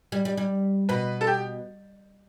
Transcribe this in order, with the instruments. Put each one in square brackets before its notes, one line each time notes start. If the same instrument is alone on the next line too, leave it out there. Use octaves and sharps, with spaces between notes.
[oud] G3
G3
G3
[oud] B2 [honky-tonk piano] B4
[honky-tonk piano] A4
G4